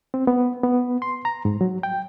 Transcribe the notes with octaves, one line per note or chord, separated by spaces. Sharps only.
C4
B3
B3
C6
A#5
G#2
F#3
G5